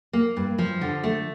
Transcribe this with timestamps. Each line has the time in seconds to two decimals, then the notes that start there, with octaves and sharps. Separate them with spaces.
0.13 A#3
0.36 G2
0.58 F3
0.81 D3
1.04 A3